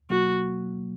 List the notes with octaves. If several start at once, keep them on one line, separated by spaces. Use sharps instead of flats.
B2 F#3 A#3 F#4